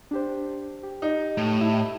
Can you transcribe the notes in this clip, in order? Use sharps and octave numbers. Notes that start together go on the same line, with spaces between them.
D4 G4 C5
G4
D#4
A2
E4